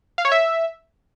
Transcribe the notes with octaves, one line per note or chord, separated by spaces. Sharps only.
F5
C#5
E5